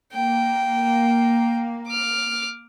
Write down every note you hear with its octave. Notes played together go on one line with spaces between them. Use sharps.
A#3 G5
D6 F6